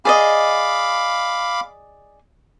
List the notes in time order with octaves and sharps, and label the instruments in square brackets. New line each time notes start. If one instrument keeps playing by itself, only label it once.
[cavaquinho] G#4 D5 D#5 [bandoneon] F5 B5 D6